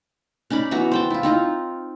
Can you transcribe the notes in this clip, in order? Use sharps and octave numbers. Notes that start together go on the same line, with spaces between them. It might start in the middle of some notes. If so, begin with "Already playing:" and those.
C#4 D#4 D5 B5
E3 B3 F#4 A#5
C5 G5 A5
E4 F4
C4 D#4 F4